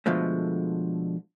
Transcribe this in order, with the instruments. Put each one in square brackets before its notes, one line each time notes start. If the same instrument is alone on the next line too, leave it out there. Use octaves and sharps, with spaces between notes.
[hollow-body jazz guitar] B2 D3 F3 G#3 A3